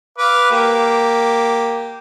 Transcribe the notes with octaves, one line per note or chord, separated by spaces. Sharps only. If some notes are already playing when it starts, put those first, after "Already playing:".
B4 F5 D6
A#3 G4